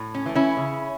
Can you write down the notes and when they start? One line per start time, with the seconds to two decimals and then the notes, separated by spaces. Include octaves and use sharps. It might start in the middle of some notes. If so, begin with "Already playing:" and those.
Already playing: A2
0.14 C#4
0.26 E3 A3
0.35 C#4 E4
0.57 C#3